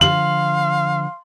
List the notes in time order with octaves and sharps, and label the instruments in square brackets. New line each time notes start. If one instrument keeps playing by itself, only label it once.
[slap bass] D3 F3 [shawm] F5 [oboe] C6 [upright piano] F#7